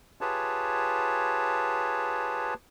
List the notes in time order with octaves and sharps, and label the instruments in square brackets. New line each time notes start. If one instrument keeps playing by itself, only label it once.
[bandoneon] F4 G4 G#4 B4 C#5 A5